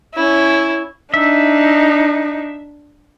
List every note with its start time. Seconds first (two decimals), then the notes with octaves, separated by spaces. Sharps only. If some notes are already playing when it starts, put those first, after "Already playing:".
0.14 C#4 E4
1.14 D4 D#4 E5